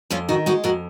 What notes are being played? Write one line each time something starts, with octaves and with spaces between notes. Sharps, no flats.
F2 C#4 F4
D#3 D#4 F#4
G#3 D#4 F#4
F2 F#4 A#4